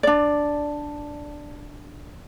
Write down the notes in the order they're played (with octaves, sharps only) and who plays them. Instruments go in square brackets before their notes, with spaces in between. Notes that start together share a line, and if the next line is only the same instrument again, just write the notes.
[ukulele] D4 D5